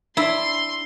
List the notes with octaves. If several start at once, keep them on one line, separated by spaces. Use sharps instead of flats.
D4 E4 C6